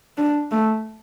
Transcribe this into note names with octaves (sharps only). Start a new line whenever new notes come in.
D4
A3